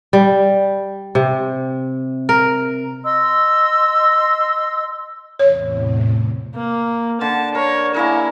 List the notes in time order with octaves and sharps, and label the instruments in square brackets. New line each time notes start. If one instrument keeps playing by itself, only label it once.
[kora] G3
C3
A#4
[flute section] D#5 C6 E6
[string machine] E2 A2 C3 [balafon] C#5
[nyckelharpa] A#3
[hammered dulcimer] D3 [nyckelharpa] A5
[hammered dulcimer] A#4 [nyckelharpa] C#5
[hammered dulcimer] A#3 G#4 A#4 [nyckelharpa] E4